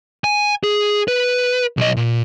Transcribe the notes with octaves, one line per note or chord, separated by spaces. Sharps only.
G#5
G#4
B4
B1 D#5
A#2